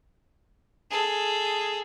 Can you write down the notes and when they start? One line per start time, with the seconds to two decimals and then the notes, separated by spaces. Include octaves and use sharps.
0.91 G#4 A4